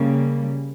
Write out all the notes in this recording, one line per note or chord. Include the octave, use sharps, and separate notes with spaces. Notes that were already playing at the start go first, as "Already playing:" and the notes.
Already playing: C#3 G3 A#3